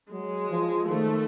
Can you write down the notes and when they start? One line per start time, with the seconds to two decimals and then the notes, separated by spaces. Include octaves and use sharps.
0.12 F#3 G#3
0.50 F3
0.89 D#3 A3